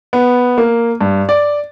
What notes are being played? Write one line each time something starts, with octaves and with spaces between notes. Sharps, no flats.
B3
A#3
G2
D5